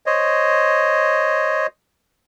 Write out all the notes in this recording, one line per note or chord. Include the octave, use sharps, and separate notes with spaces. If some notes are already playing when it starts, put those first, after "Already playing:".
C5 C#5 D#5